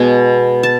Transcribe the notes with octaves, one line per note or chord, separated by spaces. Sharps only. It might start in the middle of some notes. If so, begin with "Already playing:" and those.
Already playing: B2 G#3 B3 G#5
A5